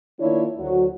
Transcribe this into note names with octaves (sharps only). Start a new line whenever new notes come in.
D#3 A#3 D4 E4 F4 C#5
D2 F#3 F#4